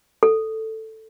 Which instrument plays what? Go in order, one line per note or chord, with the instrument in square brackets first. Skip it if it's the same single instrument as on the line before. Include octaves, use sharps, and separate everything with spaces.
[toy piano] A4